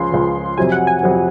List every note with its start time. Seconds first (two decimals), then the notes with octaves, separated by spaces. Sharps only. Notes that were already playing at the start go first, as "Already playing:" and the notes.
Already playing: C#2 C#3 F3 C6
0.12 C#2 C#3 F3
0.57 F2 C3 F#3 C4 G#5
0.72 F#5
0.87 G#5
1.02 F2 C3 F#3 C4